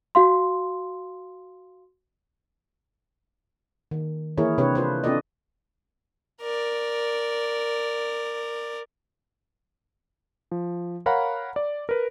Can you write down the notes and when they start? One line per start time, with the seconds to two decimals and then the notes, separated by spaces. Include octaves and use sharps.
0.15 F#4 F5 C6
3.91 D#3
4.38 E3 A#3 E4 G#4 A#4 C#5
4.58 C3 D4 G4 B4 C#5
4.75 F4 B4 C5
5.04 C4 D4 F4 A4 D5 D#5
6.41 A#4 D5
10.51 F3
11.06 A#4 C#5 F5 F#5 A#5 B5
11.56 D5
11.89 A#4 B4